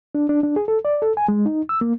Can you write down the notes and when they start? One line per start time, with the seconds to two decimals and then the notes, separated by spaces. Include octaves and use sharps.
0.15 D4
0.29 D4
0.43 D4
0.56 G#4
0.68 A4
0.85 D5
1.02 A4
1.17 G#5
1.28 G#3
1.46 D#4
1.69 E6
1.81 A#3